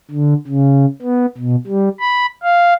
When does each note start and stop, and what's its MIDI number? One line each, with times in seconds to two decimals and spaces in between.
0.11 0.34 50
0.47 0.85 49
1.02 1.26 59
1.38 1.56 47
1.67 1.89 55
2.00 2.26 83
2.43 2.73 77